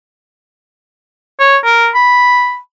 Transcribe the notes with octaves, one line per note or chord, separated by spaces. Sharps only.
C#5
A#4
B5